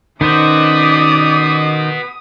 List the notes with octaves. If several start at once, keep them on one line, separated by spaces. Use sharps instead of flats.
D#3 B3 C#4 D#4 F#4 C5 D5 D#6